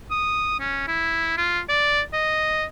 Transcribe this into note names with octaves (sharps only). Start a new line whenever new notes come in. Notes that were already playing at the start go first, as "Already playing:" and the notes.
D#6
C#4
E4
F4
D5
D#5